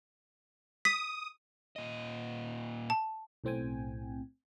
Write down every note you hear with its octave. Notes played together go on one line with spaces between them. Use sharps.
D#6 B6
A#2 D#5
A5
B1 A2 C4 G5 G#5